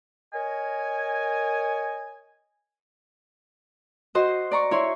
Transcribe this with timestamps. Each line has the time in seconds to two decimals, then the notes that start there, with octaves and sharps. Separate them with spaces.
0.33 A#4 C#5 D#5 G#5
4.15 F#4 C5 D#5
4.51 D5 A#5 C#6
4.71 E4 C#5 C6